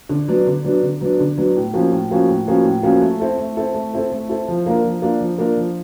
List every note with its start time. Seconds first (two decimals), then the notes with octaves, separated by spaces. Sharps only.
0.09 D3
0.28 F#3 B3 D4
0.47 D3
0.65 F#3 B3 D4
0.82 D3
1.01 F#3 B3 D4
1.20 D3
1.38 F#3 B3 D4
1.56 A2
1.74 F3 A#3 C#4 F#4
1.92 A2
2.11 F3 A#3 C#4 F#4
2.28 A2
2.47 F3 A#3 C#4 F#4
2.65 A2
2.83 F3 A#3 C#4 F#4
3.01 A3
3.20 C4 E4 A4
3.38 A3
3.57 C4 E4 A4
3.74 A3
3.94 C4 E4 A4
4.12 A3
4.29 C4 E4 A4
4.48 F3
4.66 A#3 D4 F4 A#4
4.84 F3
5.02 A#3 D4 F4 A#4
5.20 F3
5.38 A#3 D4 F4 A#4
5.57 F3